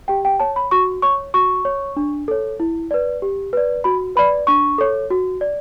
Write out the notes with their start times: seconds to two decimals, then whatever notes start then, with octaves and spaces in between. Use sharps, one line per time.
0.08 G4 G5
0.25 G5
0.40 C#5 A5
0.56 B5
0.71 F#4 C#6
1.02 C#5 C#6
1.34 F#4 C#6
1.65 C#5
1.96 D4
2.28 A4 C#5
2.60 E4
2.91 B4 D5
3.22 G4
3.53 B4 D5
3.84 F#4 B5
4.16 B4 D5 B5
4.47 D4 C#6
4.78 A4 C#5
5.10 F#4
5.41 D5